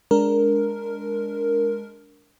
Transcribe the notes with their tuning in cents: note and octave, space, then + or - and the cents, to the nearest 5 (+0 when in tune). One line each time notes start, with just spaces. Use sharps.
G#3 +0 D4 -20 A#4 +0